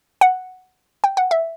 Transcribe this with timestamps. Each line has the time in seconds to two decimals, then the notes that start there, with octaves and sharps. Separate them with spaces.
0.21 F#5
1.04 G5
1.17 F#5
1.31 E5